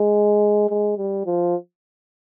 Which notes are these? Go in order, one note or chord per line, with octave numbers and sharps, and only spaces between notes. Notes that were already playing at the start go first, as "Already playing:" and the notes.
Already playing: G#3
G#3
G3
F3